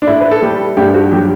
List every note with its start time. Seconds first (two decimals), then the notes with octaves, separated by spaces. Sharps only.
0.02 D4
0.07 A2 E4
0.21 B4
0.31 A4
0.42 G3 G4
0.77 G2 G4
0.89 G4
0.94 F#4
1.11 F#3 G4